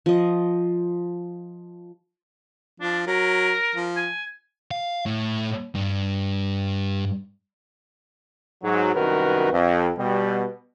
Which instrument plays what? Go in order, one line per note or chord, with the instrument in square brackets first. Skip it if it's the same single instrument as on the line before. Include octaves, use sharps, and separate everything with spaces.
[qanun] F3 D#5
[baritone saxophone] F3 [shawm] D4
[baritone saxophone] F#3 [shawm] A#4
[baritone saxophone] F3
[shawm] G#5
[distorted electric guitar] F5
A2
G2
[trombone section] G#2 F#3
C2 F#2 D#3 F#4 A#4 B4
F2
B2 G3